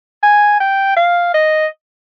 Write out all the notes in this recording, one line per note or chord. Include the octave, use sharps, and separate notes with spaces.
G#5
G5
F5
D#5